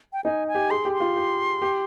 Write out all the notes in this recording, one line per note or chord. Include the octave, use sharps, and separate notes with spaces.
G5
D#4 G#5
G#5
G4
G#4 C6
G4
C6
F4
G4
G4